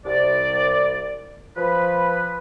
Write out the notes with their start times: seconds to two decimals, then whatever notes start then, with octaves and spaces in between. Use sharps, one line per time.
0.06 C2 D5
1.57 F3 B4